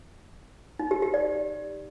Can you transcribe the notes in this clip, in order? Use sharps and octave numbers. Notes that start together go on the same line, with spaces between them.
D#4
G4
G4
D5